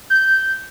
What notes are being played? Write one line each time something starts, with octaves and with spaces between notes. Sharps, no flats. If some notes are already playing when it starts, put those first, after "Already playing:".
G6